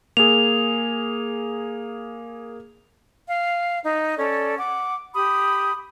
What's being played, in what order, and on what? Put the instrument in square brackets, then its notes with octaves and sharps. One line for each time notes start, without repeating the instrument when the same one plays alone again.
[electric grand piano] A#3 G#4 [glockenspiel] F7
[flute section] F5
D#4
C#4 A4 D5
F#5 D6
G4 B5 D#6